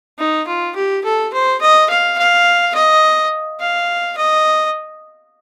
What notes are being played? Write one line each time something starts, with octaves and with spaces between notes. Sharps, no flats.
D#4
F4
G4
A4
C5
D#5
F5
F5
D#5
F5
D#5